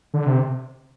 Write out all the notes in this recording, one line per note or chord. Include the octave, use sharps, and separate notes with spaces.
D3
C3